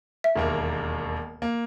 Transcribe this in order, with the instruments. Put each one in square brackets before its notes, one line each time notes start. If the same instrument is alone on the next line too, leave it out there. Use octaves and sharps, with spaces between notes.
[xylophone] E5
[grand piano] E1 D#2 A#3
A#3